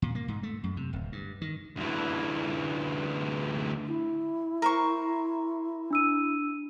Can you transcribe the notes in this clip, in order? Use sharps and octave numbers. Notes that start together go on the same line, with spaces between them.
A#2
A#3
G#2
A3
F#2
C3
D1
G2
D#3
D2 E3
E4
A#4 C5 A#5 C#6
D4 E6 D#7